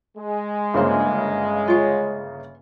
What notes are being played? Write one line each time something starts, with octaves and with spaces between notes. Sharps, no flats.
G#3
G1 C#3 A#3 C#4 C5
F4 C#5